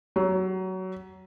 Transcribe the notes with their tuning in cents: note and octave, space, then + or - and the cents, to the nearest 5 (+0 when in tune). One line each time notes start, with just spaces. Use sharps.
F#3 +20